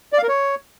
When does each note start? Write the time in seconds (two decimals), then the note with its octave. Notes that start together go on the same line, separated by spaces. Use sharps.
0.13 D5
0.18 F5
0.23 A#4
0.29 C#5